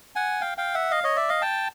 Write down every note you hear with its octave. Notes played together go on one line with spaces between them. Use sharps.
F#5 G#5
F5 G5
F5 G5
E5 F#5
D#5 F5
C#5 D#5
D5 E5
D#5 F5
G5 A5